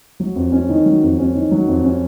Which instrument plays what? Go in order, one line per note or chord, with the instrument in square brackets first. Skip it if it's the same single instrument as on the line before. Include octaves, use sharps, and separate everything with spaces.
[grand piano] F#3
F2
C#4
D#3
F#3
F2
C#4
D#3
F#3
F2
C#4